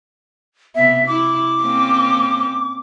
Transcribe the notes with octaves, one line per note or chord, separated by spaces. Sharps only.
C3 B3 E5
E4 D6
A#3 C4 C#4